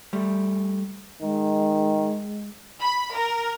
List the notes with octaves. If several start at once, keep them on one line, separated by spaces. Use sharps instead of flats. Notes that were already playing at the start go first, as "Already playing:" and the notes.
G3 A3
D#3 G#3
B5
A#4